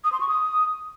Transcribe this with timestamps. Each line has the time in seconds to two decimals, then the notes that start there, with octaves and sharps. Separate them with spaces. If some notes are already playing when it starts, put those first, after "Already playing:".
0.04 D#6
0.12 C6
0.20 C#6
0.28 D#6